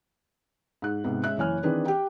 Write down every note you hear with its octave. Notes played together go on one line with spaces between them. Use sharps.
G#2 F#6
G#2 C3 G#3 B3
G#3 C#4 E5 F#6
F#1 E3 C#5 G#5 F6
D#3 E3 C4 D4 G#4 B4
G4 G5